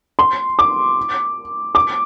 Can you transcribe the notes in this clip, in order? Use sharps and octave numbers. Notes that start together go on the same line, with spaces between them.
C6
D6
D6